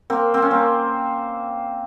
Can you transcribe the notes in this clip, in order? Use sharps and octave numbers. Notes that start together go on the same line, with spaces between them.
A#3 C4
C4
C#4
A#3 C4